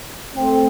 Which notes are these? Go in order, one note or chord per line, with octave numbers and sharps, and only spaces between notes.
A3 C4